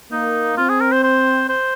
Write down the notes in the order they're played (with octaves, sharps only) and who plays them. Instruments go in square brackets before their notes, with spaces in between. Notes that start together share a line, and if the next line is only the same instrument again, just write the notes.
[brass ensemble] A#3 [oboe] D#4
[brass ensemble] C4 [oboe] F4
[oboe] G#4
A#4
C5
C5
C5